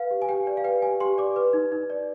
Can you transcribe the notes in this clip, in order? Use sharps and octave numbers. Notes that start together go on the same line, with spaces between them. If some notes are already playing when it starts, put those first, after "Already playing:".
Already playing: B4 F5
G4
G#5
G4 G5
D5
F5
B4 G5
G4 G#5
G4 C6
D5 D6
B4
D#4
D#4
D5